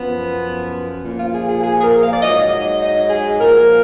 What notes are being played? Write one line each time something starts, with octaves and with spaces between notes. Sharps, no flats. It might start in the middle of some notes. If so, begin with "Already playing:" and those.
Already playing: F#2 F3 B3
A#2 F3
F4
G#4
G#4
G#4
G#4
A#4
F5
D5
G#2 F#3 D#5
D#5
D#5
G#4
A#2 F3 A#4